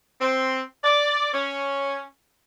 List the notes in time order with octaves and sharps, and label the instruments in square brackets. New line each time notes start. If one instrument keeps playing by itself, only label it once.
[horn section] C4
D5
C#4